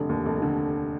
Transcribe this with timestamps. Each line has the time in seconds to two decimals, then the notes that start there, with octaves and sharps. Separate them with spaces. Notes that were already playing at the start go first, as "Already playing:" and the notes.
Already playing: F1 D3
0.09 D#2
0.26 F1
0.42 D3